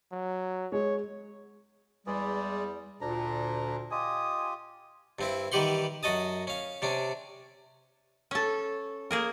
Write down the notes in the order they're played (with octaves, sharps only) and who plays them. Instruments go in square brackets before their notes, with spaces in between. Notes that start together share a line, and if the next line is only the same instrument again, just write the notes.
[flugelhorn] F#3
[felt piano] G#3 [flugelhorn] C#5
[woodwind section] E2 G3 [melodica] G#3 G#4 D5
[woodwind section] D2 A#2 [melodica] D4 A#5
[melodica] F4 G4 [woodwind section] D#5 G#5 D#6
[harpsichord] G2 C4 E4
D#3 E3 G3 G4 F#5 C6
F#2 F#4 D#5 A5 D#6
C#4 F5
C3 C#4 D4
[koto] C#4 A4
A#3 G#4 A#4